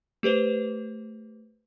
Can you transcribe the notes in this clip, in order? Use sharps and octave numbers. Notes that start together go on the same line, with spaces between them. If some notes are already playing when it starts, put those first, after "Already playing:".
A3 G4 B4 C5